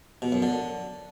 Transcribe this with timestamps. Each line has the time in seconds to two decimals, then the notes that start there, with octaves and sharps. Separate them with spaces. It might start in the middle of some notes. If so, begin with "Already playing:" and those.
0.22 B2
0.32 F#2
0.43 D3